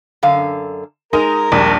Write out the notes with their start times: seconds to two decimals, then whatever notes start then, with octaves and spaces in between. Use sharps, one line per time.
0.23 F#2 D3 F5
1.13 G#3 D#4 A#4
1.52 A#1 D#2 G3